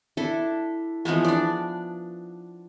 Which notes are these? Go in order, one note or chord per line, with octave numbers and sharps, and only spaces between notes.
D4 E4 A4
E3 F3 G#3 B3
D4 D5